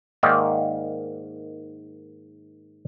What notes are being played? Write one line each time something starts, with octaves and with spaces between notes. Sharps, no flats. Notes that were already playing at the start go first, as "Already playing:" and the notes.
G#2 D#3 A#3 D#4 D5 E5